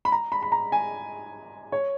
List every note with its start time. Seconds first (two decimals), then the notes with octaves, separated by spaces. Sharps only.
0.05 B5
0.12 A#5
0.32 B5
0.43 B5
0.52 A#5
0.72 G#5
1.72 C#5